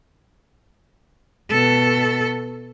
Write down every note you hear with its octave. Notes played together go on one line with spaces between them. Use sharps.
B2 A4